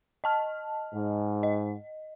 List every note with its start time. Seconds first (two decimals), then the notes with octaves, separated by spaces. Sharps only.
0.24 D#5 A5 F6
0.93 G#2
1.43 D#5